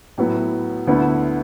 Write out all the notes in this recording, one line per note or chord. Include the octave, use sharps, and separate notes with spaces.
A2 F#3 B3 E4
D2 D3 B3 E4